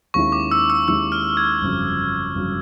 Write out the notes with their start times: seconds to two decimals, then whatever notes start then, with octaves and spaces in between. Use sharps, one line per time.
0.14 D#2 D#3 G#3 C#4 E4 C#6
0.32 D6
0.51 E6
0.70 E6
0.88 D#2 D#3 G#3 C#4 E4 E6
1.12 F6
1.37 G#6
1.61 G1 F2 C#3 F#3
2.35 G1 F2 C#3 F#3